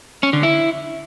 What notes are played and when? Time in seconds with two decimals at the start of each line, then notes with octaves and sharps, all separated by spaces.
0.23 C#4
0.33 D3
0.43 E4